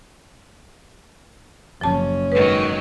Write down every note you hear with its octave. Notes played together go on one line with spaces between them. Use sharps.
F#1 F3 C#4 A5
G#2 D#3 F#3 B4